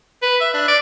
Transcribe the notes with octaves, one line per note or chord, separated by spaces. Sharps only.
B4
E5
D4
D5